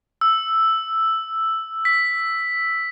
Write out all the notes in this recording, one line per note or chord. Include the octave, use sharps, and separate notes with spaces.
E6
B6